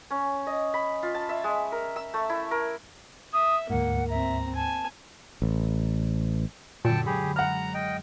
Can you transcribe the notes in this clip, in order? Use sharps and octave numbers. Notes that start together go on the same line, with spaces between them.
C#4
D#5
B5
F4
A5
E5
G#3
A#4
E6
A3
E4
A#4
E5 D#6
D2 G#2 A#3 F#5
C4 E5 A#5
G#5 A5
A1
F#2 A#2 D3 C#5 G5 A5
F#2 G#3 G4 G#4 B5
F#5 A#5 F6
D#5 G5